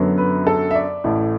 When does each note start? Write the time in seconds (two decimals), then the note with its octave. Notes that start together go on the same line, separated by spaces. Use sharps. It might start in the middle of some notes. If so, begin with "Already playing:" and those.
Already playing: F#2 D3 F#3 B3
0.18 B4
0.47 A4
0.71 E5
0.75 D5
1.04 A1 A2 A3